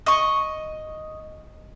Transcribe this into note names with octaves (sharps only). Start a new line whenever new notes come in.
D#5 C#6